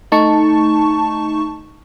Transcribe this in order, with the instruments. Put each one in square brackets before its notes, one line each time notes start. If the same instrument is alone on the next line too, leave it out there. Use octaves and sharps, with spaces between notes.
[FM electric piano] A3 D#4 A5 C#6